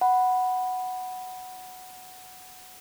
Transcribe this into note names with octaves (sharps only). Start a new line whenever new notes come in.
F#5 B5